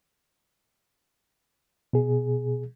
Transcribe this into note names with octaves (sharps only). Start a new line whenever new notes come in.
B2 G#4